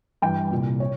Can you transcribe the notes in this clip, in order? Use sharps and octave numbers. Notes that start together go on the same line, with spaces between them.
G2 E3 G5
C2 A#2
C#5